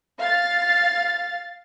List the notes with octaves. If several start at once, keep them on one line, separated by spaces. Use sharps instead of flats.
F5 A6